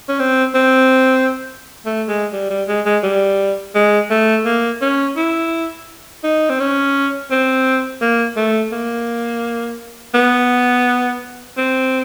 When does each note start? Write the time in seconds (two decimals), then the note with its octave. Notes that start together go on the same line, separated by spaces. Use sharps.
0.09 C#4
0.19 C4
0.55 C4
1.86 A3
2.09 G#3
2.33 G3
2.50 G3
2.68 G#3
2.86 G#3
3.03 G3
3.75 G#3
4.11 A3
4.45 A#3
4.81 C#4
5.17 E4
6.24 D#4
6.49 C4
6.60 C#4
7.31 C4
8.01 A#3
8.37 A3
8.72 A#3
10.14 B3
11.57 C4